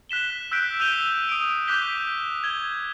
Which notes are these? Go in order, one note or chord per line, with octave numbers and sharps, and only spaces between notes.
F#6 B6 E7 G7
E6 F#6 G6 B6 D7
E6 G6 D#7 F7 G7
D#6 D7
D6 F#6 G6 B6 G7
G#6 G7